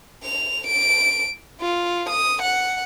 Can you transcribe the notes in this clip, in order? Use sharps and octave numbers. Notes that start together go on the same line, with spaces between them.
F7
D7
F4
D#6
F#5